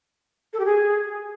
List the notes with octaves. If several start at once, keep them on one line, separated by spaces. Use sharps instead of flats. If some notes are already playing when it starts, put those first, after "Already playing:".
A4
G4
G#4